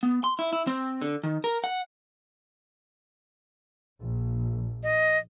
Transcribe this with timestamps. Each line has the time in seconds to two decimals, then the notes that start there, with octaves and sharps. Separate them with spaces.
0.03 B3
0.24 C6
0.39 E4
0.53 E4
0.67 C4
1.02 D3
1.24 D#3
1.44 A#4
1.64 F#5
4.01 A#1
4.83 D#5